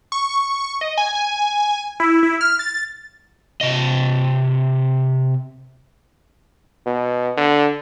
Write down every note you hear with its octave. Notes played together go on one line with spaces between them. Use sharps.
C#6
D#5
G#5
G#5
E4
E4
F6
A6
C3 D#5
B2
D3